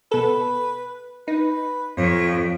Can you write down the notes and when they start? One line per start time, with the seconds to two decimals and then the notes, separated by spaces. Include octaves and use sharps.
0.12 B2 A4 B4
1.28 D#4 B4
1.98 F2 C#5